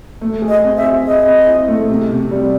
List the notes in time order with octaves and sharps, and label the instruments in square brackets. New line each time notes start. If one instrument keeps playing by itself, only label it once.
[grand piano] A3
G#4
[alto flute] D#5
[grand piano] C4
[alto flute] E5
[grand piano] G#4
[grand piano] G#4 [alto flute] D#5
[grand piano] C4
E4
A3
C3
C3
G3